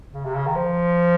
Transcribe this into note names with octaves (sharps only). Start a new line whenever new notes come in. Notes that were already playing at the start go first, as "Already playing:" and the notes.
C#3
C3
C#3
D#3
F3